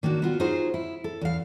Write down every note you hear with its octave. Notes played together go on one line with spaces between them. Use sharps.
D#3 A#3 D4 F#4
B3 F4 F#4
D#4 F4 F#4 G#4 C5
E4
A4
E2 F5